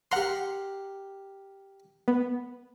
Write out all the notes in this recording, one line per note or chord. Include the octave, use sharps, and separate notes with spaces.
G4 A#4 F#5 A#5 C6
B3